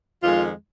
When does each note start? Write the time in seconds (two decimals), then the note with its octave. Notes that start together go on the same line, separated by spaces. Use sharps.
0.21 F2 D#3 G#3 F4